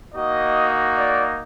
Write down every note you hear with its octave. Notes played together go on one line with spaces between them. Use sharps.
A#3 D#4 F#4 D#5
D5